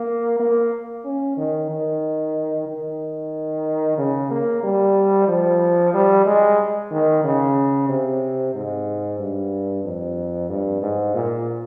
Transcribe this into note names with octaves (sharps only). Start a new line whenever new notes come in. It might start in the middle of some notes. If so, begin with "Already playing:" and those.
Already playing: A#3
A#3
C#4
D#3
D#3
D#3
C#3
A#3
G3
F3
G3
G#3
D#3
C#3
C3
G#2
G2
F2
G2
G#2
A#2